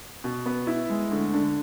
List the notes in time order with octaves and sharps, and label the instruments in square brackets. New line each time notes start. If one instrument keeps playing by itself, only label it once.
[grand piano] B2
B3
E4
G#3
D2
D3